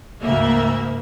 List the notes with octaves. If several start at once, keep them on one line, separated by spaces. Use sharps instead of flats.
D2 G#2 C#3 A#3 E5